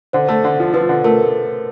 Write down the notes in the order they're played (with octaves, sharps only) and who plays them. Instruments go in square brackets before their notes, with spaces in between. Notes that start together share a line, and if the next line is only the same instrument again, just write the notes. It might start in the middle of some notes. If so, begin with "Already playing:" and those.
[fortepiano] D3 [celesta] C5
[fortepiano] A3
D3
F3
[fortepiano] F3 [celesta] B4
[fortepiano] D3
[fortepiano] A3 [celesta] A#4